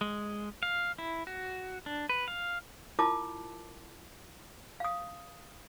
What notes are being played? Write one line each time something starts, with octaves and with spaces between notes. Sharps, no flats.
G#3
F5
E4
F#4
D4
B4
F5
E4 F4 A#4 A5 D6
F5 D#6